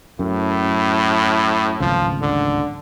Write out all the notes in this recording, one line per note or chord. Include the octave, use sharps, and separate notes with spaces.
F#2 A2
D1 G#1 C#2 F3
D3